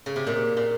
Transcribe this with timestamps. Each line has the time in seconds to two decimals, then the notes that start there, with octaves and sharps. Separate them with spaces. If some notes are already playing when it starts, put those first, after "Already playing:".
0.06 C#3
0.16 C3
0.27 A#2
0.57 A#2